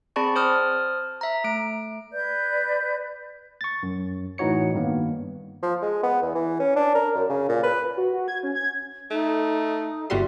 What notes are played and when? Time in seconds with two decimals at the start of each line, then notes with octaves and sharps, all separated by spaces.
0.16 C4 G#4 D5 A5 B5 C#6
0.36 C5 A5 D#6 F6
1.21 E5 A#5
1.44 A3 D7
2.12 B4 D5 G6
3.61 C#6 A6
3.83 F#2
4.38 A2 E3 D#4 F#4 C#5 C#7
4.74 G2 D#3 A#3 B3
5.63 F3
5.82 G#3
6.03 B3
6.22 E2
6.35 E3
6.60 C#4
6.76 D4
6.95 A#4
7.15 F#2
7.30 C#3
7.49 A#2
7.63 B4
7.97 F#4
8.13 F#4
8.28 G#6
8.43 C#4
8.55 G#6
9.11 A3 D#4
10.10 G1 G3 F#4 E5 C6